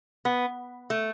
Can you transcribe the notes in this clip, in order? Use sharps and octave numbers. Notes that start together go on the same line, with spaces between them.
B3
A3